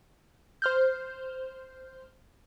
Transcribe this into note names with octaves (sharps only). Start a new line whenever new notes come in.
C5 F6 G6